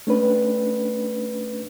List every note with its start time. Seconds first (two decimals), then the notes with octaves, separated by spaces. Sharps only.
0.07 A3 C#4 D4 B4